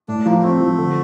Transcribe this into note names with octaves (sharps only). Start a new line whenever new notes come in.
A2 D4
F3 A#3
G3
A3 C4
F3
D3